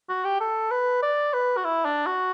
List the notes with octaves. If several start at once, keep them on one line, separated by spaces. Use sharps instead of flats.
F#4
G4
A4
B4
D5
B4
F#4
E4
D4
F#4